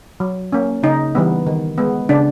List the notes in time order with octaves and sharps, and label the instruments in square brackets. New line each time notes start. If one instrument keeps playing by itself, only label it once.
[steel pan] F#3
A#3 C#4
C#3 D#4
E3 G3 B3
D#3
G#3 B3
C#3 D4